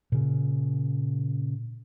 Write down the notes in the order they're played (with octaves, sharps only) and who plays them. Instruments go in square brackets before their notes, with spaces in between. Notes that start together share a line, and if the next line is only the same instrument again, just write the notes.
[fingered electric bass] A#2 C#3